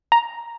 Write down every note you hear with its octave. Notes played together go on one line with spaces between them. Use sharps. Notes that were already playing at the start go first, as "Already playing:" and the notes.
A#5